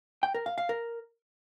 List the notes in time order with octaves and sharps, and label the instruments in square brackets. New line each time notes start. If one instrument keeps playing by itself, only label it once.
[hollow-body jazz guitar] G5
A#4
F5
F5
A#4